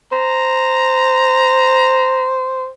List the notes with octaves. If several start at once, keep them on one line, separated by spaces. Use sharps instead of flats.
C5 A#5